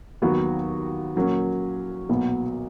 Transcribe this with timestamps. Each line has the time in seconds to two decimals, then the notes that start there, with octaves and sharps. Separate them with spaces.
0.22 D#2 D#3 F#3 B3 F#4
1.15 A#2 F#3 A#3 C#4
2.09 B1 A#2 F#3 B3